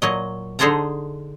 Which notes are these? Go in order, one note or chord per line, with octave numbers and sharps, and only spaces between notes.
A#2 F#3 D#5
D3 D#4 G#4 C5 A5 A#5